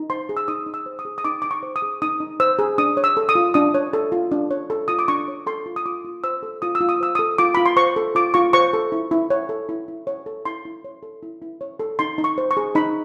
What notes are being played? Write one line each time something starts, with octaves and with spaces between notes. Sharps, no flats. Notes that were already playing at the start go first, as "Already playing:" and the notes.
Already playing: D#4
C5 C6
G#4
E6
D#4 D#6
D#4
E6
C5
D#6
G#4
D#6
D#4 D6
D#4 D6
C#6
C5
D#6
G#4
D#4 D#6
D#4
C5 E6
G#4
D4 D#6
C#5
E6
A4
D#6
F4
D4 D#6
C#5
A4
F4
D4
C#5
A4
F4 D#6
D6
D4 C#6
C#5
A4 C6
F4
D#6
F4 D6
F4
C5 E6
A4
F4 D#6
E6
F4
D#6
C5 E6
A4 D#6
F4 D6
F4 B5
C6
C5 C#6
A4
F4 D6
F4 C#6
C5 C#6
A4
E4
E4
C#5
A4
E4
E4
C#5
A4
E4 C6
E4
C#5
A4
E4
E4
C#5
A4
D#4 C6
D#4
C#6
C5
C#6
G#4
D#4 B5